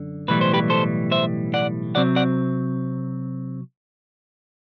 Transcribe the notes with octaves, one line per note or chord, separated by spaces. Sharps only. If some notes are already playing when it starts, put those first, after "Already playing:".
Already playing: F#2 D3
B1 A2 E3 G3 B4
C5
G4 B4
A4 C5
C5 E5
D5 F#5
C3 F#3 C4 D5 F#5
D5 F#5